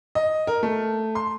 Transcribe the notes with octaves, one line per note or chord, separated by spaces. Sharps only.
D#5
A#4
A3
C6